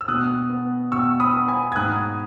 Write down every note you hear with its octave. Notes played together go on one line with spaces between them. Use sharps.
E6
B2 D#6 F#6
B3
B2 C#6 E6
B5 D#6
B3
G#5 B5
G#6
G#2 D#6 F#6